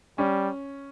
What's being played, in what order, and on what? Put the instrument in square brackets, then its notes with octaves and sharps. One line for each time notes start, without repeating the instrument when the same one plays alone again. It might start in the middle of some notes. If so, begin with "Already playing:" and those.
[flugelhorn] G3 [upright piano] C#4